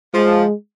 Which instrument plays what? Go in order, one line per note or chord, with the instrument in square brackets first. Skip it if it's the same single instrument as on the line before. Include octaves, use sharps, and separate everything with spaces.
[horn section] F3 [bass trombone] G#3